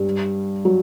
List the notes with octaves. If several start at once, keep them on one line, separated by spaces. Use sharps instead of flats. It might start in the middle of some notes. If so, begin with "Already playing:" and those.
Already playing: G2 G3
F#3